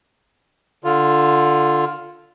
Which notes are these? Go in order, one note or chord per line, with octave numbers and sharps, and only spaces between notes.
D3 F4